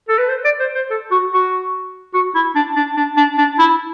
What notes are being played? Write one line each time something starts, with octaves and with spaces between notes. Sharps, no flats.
A4
B4
C5
D5
C5
C5
A4
F#4
F#4
F#4
E4
D4
D4
D4
D4
D4
E4